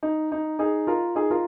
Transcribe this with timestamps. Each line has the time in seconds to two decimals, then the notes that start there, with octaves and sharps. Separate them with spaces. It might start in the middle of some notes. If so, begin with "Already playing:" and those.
0.03 D#4
0.32 D#4
0.59 D#4 G#4
0.87 F4 A#4
1.15 D#4 G#4
1.31 F4 A#4